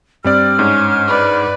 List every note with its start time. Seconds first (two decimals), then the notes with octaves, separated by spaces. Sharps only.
0.24 G2 G3 C4 D5 F6
0.59 G#2 C#4
1.07 B4 D5